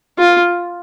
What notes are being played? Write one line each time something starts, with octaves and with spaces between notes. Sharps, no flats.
F4